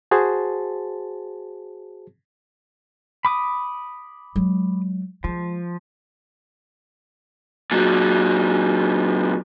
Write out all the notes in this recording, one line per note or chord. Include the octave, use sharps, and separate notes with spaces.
F#4 G#4 C5 A5
B5 D6 D#6
F#3 G#3
F3 G#3
A#2 F#3